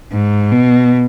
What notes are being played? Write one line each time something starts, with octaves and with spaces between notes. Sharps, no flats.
G#2
B2